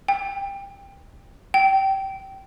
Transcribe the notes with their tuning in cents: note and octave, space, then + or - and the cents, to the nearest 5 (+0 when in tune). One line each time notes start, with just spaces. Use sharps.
G5 +20
G5 -20